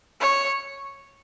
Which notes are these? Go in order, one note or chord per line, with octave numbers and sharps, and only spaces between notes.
C#5